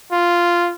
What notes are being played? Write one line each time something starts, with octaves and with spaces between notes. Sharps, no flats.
F4